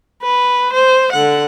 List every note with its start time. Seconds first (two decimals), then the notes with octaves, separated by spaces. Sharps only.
0.23 B4
0.73 C5
1.13 D3 F#5